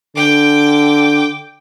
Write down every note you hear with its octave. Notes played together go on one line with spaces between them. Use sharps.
D3 G5 D6